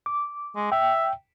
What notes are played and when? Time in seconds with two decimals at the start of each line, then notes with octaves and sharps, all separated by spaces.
0.06 D6
0.56 G#3
0.72 E5 G5